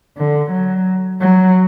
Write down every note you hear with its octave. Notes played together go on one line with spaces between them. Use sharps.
D3
F#3
F#3